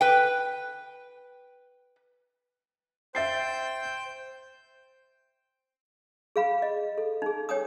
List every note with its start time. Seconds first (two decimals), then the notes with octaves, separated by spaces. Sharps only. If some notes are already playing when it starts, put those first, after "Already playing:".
0.01 B4 G5
3.15 C5 E5 G5 G6 A6 C7
6.36 G#4 F5 B5
6.62 D#5
6.98 A4
7.22 D#4 G#4
7.49 C#5 G5 G#5 D#6